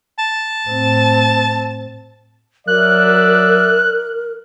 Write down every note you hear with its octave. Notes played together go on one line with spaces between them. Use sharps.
A5
A2 C4
F#3 A#4 D5 E5 F#6